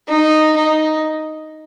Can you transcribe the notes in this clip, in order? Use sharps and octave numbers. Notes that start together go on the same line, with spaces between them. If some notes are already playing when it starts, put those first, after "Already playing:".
D#4
D#4